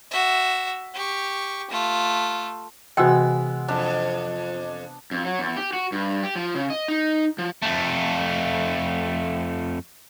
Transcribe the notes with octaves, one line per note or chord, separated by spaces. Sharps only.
F#4 E5
G4 C#6
A3 F4
C3 E3 G#3 B3 F#4 G5 E6
F2 D4
F2
F#3
E2
G4
F#4
G2
G4
F3
C#3
D#5
D#4
F3
F2 A3